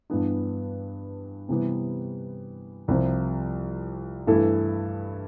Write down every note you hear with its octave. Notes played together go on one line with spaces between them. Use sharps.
G2 E3 B3 D4
C3 E3 G3 B3
C2 C3 F3 C4
G2 E3 A3 E4 A4